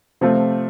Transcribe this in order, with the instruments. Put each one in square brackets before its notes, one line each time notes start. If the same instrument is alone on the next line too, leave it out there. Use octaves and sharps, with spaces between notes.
[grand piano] C3 F3 A3 C4 F4